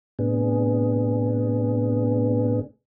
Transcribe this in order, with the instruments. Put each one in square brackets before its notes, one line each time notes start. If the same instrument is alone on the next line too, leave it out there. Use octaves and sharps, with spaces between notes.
[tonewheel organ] A2 C3 B3 D4 G#4